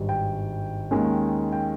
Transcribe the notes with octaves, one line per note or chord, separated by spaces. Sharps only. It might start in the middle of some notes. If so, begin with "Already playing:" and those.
Already playing: G#1 G2 G3
G5
D#2 D#3 G#3 C#4
G5